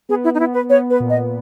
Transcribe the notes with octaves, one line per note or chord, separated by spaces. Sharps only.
B3 G#4
E4
D#4
B3 E4
B4
B3 C#5
B4
A#2
D#5